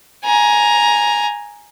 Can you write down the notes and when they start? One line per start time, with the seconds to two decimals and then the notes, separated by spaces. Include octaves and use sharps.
0.25 G#5 A#5